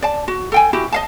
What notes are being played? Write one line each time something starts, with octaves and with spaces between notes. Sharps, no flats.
D5 A5
F#4
A4 G5 G#5
E4 F#4 G4
D#5 F5 A5